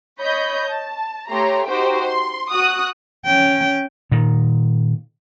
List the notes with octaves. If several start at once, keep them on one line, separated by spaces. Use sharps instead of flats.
C#5 D#5 B5 G6
A5
A3 G4 C#5 A#5 C6
D#4 F#4 G4 C5 G5
C6
F#4 D#6 F#6
C#4 G5
A#2 D#3